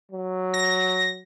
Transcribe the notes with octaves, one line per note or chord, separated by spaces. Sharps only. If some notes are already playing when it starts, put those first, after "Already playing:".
F#3
A#6